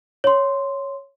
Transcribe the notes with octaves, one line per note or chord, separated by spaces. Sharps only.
C#5 C6